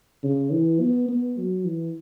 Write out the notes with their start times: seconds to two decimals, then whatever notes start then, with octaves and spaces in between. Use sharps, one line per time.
0.23 C#3
0.52 E3
0.81 B3
1.09 B3
1.38 F#3
1.65 E3